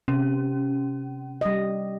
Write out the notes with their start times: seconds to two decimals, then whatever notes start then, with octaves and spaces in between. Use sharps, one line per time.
0.08 C3 C#4
1.41 G3 D#5